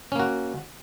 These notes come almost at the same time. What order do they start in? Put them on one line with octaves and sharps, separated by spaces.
C#4 A#3 F#4